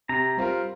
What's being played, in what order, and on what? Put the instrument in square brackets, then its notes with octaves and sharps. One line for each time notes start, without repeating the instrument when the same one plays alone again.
[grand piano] C3 [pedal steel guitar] A#5
[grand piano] G3 C4 F4 A#4